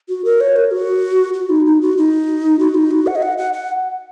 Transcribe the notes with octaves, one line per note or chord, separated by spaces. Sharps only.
F#4
A#4
C#5
A#4
F#4
F#4
D#4
D#4
F#4
D#4
F#4
D#4
F#4
F#5
D#5
F#5
F#5
F#5